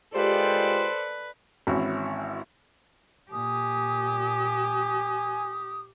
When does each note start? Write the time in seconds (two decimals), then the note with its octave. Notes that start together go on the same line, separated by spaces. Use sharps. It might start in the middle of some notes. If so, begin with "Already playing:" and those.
0.15 G#3 F4 G4 A4 B4 C5 D5
1.67 G#1 E3 C#4 E4 F#4
3.32 A#2 G4 G#5 D#6